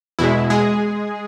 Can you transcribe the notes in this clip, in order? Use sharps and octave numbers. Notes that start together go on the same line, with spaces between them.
E2 B2 G#3 E4
G#3 G#4